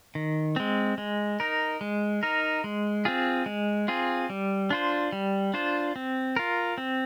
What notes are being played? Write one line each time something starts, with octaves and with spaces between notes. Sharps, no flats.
D#3
G#3 C4
G#3
D#4 A#4
G#3
D#4 A#4
G#3
C4 F4 G#4
G#3
C4 F4 G#4
G3
D4 F4 C5
G3
D4 F4 C5
C4
F4 A#4
C4